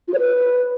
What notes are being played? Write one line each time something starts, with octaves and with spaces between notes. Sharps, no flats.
F4
C#5
B4